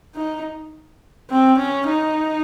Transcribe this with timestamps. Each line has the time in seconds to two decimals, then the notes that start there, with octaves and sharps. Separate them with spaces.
0.15 D#4
1.30 C4
1.58 C#4
1.87 D#4